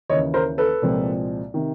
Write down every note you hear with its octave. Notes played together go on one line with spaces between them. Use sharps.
D#2 C#3 E3 C#5 D#5
A#4 C5
A4 B4
C2 A#2 F3 G#3 C4
C3 D#3